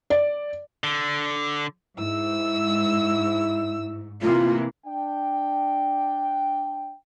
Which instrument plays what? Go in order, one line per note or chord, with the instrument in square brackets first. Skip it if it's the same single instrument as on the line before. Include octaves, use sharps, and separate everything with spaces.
[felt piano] D5
[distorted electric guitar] D3
[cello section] G#2 [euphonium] E4 [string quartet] E6
[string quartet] C3 E3 [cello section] A#3 [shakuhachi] F4
[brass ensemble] D4 G5